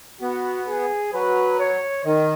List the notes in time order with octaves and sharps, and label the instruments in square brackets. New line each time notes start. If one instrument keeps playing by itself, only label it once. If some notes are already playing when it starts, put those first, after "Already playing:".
[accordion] B3 [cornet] F#4
[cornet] G#4
[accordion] F#3 [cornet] B4
[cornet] C#5
[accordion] D#3 [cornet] D#5